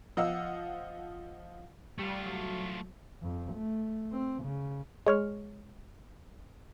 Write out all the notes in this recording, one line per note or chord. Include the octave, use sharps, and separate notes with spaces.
F3 D#5 F5 F#5 E6
G3 A3 F4
F#3
F2
A3
C4
C#3
G#3 C#5 F6